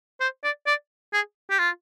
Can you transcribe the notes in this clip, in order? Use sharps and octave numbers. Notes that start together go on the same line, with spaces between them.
C5
D5
D5
G#4
G4
F4